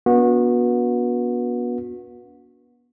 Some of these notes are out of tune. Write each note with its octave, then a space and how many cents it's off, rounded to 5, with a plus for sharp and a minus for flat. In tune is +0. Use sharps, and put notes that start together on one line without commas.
B3 -30 D4 -45 F#4 -30